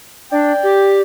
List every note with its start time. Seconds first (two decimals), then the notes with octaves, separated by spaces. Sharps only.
0.32 D4 D5 G5
0.63 G4